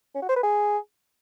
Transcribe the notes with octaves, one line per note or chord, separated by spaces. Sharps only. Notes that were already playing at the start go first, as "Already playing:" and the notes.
C#4
F#4
C5
B4
G#4